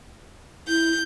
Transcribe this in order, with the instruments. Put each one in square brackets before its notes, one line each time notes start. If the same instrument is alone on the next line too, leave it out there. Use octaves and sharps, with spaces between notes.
[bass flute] E4 [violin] G6